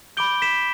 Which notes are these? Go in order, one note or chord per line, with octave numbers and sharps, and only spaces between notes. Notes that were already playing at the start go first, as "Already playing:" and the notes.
B5 D6 G6 D7 G7
B6 E7